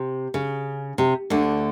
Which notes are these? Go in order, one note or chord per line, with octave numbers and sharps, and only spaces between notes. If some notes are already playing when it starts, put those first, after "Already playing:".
Already playing: C3
C#3
C3
D2 D3